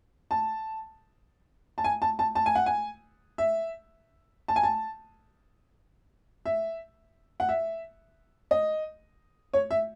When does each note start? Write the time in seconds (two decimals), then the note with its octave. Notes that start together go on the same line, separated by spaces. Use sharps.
0.31 A5
1.78 A5
1.84 G#5
2.02 A5
2.19 A5
2.35 A5
2.46 G#5
2.55 F#5
2.66 G#5
3.38 E5
4.48 A5
4.56 G#5
4.63 A5
6.46 E5
7.40 F#5
7.49 E5
8.51 D#5
9.54 C#5
9.71 E5